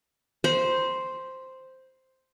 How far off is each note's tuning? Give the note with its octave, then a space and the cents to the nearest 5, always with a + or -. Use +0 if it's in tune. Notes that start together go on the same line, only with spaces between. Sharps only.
C5 +0 B5 -35